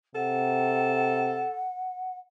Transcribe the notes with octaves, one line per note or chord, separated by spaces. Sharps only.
C3 A4 F#5